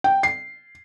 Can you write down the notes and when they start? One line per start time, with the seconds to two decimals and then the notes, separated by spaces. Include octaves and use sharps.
0.04 G5
0.23 C7